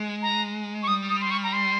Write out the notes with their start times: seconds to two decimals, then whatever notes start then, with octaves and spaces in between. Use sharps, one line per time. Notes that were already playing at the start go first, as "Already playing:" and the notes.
Already playing: G#3
0.22 A#5
0.83 C#6
0.88 G3 D#6
1.10 D#6
1.21 C6
1.31 C#6
1.44 A#5
1.53 C6